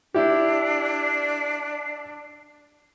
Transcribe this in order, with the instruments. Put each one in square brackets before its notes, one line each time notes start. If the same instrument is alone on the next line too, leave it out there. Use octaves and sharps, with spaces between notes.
[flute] D4 [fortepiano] E4 G4